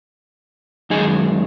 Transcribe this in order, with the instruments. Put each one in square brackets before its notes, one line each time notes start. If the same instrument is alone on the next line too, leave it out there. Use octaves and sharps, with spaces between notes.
[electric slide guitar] F#2 D#3 G#3 D#4 G#4